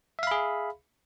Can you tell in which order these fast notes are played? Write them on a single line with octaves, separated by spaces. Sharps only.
E5 F5 B5 G#4